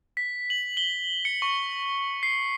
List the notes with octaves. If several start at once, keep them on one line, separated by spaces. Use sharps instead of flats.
B6
F#7
G7
C#7
C#6
C7